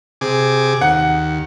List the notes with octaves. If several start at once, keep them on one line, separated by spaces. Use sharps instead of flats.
C3 G#4 D6
D#2 F#5